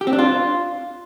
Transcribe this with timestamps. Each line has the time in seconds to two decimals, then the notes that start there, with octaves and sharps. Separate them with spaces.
0.01 G4
0.07 C4
0.13 D4
0.19 F4